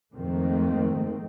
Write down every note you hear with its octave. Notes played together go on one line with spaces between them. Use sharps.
F2 G#2 D#3 A3 A#3 C4